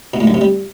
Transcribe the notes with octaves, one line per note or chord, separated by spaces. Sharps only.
B2
A2
F#2
C3
G3